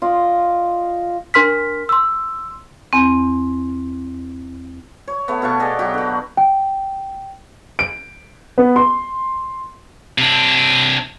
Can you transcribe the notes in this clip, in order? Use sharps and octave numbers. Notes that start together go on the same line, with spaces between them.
F4 D5 D#5
D4 A#4 C6 F6 B6
C6 E6
E2 C4
C#5
A3 B3
B2 F5 A5 C#6
G#4 D5 D#5
F#3 F#4 G4
D3 F#4
G5
D7
B3
C6
C3 D4